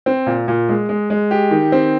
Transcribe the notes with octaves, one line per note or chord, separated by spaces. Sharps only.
C4
A#2
A#2
G#3
G#3
G#3
G4
D#3
C4